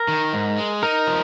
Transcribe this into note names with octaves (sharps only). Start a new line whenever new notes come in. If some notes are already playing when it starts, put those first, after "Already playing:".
Already playing: A#4
D#3
G#2
G#3
D#4 A#4
F3